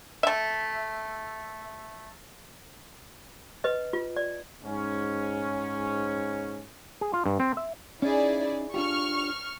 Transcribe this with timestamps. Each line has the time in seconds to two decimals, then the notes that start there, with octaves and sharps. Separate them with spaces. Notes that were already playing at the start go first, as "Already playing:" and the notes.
0.23 A3 E5
3.64 B4 D#5
3.93 F4
4.17 D5
4.65 G#2 C#4
7.01 G#4
7.13 F4
7.26 G2
7.40 C4
7.57 E5
8.02 C#4 D#4 E4 G#4 D5
8.74 D4 F4 G4 C#6 F6